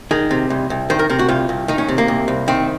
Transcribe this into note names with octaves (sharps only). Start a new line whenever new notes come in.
D#3 G#4
C3
C2
C2
D#3 C5
A#4
C3 A#4
F#4
C2 F4
C2
D#3 D#4
C#4
C3
A#3
C2
C2
D#3 C4